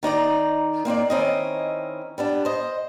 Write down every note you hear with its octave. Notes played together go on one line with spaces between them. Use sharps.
D#3 D#4 D5 A#5
A#3 C4 D#4 D5
D#3 E3 C4 C#4 E4 D#5
G3 B3 D4
C5 D#5